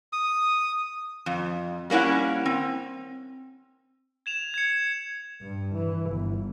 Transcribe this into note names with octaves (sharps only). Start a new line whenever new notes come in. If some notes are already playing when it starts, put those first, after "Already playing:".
D#6
F2
G3 A#3 C#4 E4 F#5
C4
G#6 E7 F7
G#6 C#7
G2
E3
G1